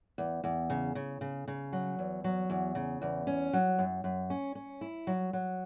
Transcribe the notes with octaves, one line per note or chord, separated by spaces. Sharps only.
E2
E2
C#3
C#3
C#3
C#3
F#3
E2
F#3
E2
C#3
E2
C#4
F#3
F#2
F#2
C#4
C#4
E4
F#3
F#3